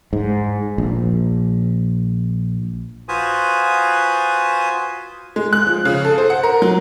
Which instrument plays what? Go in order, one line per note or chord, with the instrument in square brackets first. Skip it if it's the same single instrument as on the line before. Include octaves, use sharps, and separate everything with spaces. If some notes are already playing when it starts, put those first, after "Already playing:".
[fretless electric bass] G#2
A#1
[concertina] F4 F#4 B4 C5 G#5 D#6
[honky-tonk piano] G#3
F#6
F3
C#3
A4
C5
F#5
A#4
F#3